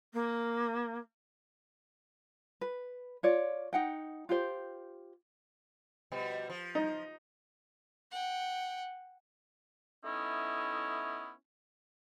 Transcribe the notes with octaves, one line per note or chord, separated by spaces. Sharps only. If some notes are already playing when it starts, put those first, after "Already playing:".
A#3
B4
F4 C#5 D5
D#4 F#5 G5
F4 G4 C5
B2 F3 G3
F3
D#4
F#5 G5
A3 B3 C#4 D#4 E4